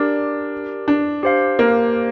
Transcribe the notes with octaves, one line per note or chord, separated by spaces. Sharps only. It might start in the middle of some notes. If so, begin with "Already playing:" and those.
Already playing: D4 G4 A#4 D5
D4
G4 C5 F5
A#3